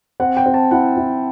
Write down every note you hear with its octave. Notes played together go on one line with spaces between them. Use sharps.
C4 F#5
G5
C4
A5
E4 F#5
E4